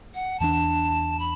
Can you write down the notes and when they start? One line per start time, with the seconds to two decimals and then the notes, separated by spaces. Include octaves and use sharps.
0.14 F#5
0.40 E2 E3 B3 D4 A5
1.19 B5